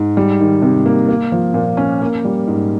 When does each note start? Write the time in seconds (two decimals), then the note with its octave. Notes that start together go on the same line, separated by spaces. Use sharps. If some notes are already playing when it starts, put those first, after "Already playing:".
Already playing: G#2
0.17 G3
0.40 D#3
0.62 C3
0.86 A#3
1.09 A#3
1.32 F3
1.54 A#2
1.77 C#4
2.01 A#3
2.25 G3
2.48 G#2